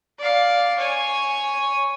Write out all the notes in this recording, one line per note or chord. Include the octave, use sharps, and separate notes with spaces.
D5 F5
C#5 G#5